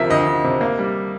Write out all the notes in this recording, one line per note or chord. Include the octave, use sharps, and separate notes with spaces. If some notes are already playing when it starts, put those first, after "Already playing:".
Already playing: D2 C3 F3 A#4 E5
D2 D#5
D2
C3
A#3
G3